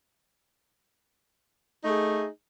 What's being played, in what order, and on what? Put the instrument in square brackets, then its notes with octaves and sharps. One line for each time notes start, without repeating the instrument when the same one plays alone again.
[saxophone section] D#4
A3
G#4